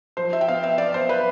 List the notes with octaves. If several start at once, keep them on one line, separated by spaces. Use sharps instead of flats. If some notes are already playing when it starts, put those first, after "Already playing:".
F3 C5
E5
G5
B3 F5
E5
B3 D5
C5
B4